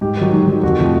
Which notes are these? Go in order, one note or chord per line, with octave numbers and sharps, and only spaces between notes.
G#2 G4
D#3 F#3
G#2
D#3 F#3
F2 F#4
C3 F3 A3